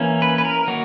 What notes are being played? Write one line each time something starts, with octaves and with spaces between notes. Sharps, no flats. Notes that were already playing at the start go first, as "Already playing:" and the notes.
Already playing: E3 A#3 C#4
B4
B4
A#4
D#3 F#3 A#3 F#4